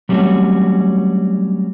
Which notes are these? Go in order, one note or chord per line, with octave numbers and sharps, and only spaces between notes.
F#3 G3 A3 C4 C#4 F#4